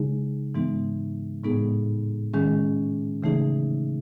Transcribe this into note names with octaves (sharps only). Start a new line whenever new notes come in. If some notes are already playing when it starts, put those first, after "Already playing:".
Already playing: C#3 G#3 D#4 G#4
G#2 E3 G#3 B3 D#4
A2 G#3 B3 D#4 G#4
D#3 G#3 C#4 G#4
C#3 E3 A3 D#4 G#4